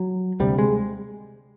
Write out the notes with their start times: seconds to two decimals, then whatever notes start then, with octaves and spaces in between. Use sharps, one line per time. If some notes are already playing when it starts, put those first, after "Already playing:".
Already playing: F#3
0.40 D2 C3 G3
0.59 G#3